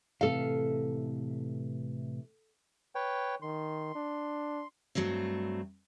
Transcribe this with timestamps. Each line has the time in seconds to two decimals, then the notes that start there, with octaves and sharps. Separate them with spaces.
0.21 A2 C3 E3 A4 F5
2.95 B4 C#5 G5
3.42 D#3 C6
3.95 D4
4.95 G2 F#3 A3 C4